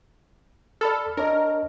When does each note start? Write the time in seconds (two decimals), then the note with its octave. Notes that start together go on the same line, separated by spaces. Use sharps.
0.81 A4 D5 B5 F6
1.17 D4 A#4 C#5 D#5